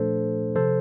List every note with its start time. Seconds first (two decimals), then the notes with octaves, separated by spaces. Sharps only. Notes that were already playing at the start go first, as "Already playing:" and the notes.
Already playing: A#2 F3 A3 D4 A4 C5
0.56 C3 F3 A4 C5